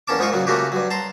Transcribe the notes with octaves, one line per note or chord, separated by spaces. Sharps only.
E2 A#3 C#4 A5 D6
G#2 G#3 D#4 F4 C#6
A#2 C#3 F#3
C#3 A3 A#3 F#4 G4
G2 F#3
A5 A#5 C6